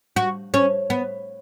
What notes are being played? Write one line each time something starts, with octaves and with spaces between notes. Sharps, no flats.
F#4
C#4
B3